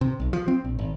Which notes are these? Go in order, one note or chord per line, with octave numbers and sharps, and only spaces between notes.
C3
B1
F3
C4
A#1
G#1